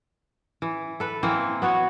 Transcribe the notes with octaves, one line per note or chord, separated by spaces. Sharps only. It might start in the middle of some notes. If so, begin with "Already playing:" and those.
E3
A4 B4
E3 A#3 C4
B3 F#4 C#5